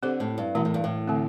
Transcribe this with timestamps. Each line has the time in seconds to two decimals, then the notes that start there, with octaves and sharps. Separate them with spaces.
0.03 D3 C4 G4 C5
0.20 A2
0.38 G2
0.55 B2 E3 A3 E4
0.65 A2
0.74 G2
0.84 A2
1.07 D3 A3 C4